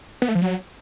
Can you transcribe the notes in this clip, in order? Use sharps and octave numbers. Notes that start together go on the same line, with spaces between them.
B3
A3
F3
F#3